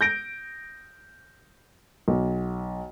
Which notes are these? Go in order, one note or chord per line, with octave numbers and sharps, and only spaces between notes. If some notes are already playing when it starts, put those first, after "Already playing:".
G6 A#6 D7
B1